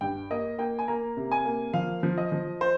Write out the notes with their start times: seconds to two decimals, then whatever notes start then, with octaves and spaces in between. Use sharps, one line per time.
0.01 G2 G5
0.31 A#3 D#5
0.58 A#3 G5
0.79 G#5
0.88 A#3 A#5
1.17 C3
1.31 G#5
1.45 A#3
1.74 F3 F5
2.03 F3
2.18 D#5
2.32 F3
2.61 C5